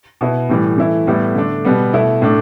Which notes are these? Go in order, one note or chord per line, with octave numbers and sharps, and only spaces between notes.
B2 B3 E4
A2 E3 G3
E3 A3 E4
A2 G3 B3 E4
D3 A3 D4
B2 G3 B3
B2 A3 E4
A2 A3 D4